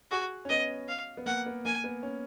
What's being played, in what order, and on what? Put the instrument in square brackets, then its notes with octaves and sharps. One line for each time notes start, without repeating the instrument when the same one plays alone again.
[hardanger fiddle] F#4 [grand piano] G#4
[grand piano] C#4
[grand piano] B3 [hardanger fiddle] D#5
[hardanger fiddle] F5
[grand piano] B3
[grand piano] A#3 [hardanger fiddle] F#5
[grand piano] B3
[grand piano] A#3 [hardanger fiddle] G#5
[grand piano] B3
C#4